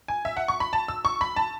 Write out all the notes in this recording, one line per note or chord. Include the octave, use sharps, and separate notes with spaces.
G#5
E5
F#5
C#6
B5
A5
E6
C#6
B5
A5